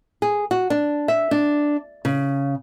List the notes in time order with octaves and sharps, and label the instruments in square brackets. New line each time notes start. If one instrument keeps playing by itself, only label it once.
[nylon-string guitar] G#4
F#4
D4
E5
D4
C#3